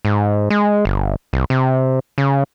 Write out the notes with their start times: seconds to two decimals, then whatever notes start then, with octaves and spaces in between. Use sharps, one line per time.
0.05 G#2
0.50 G#3
0.85 G1
1.33 C2
1.50 C3
2.18 C#3